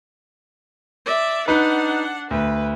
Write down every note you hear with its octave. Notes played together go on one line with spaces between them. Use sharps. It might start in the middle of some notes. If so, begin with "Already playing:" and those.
D5 E5
D4 D#4 B4 F#5
D2 B4